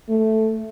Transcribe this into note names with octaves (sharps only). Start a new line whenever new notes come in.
A3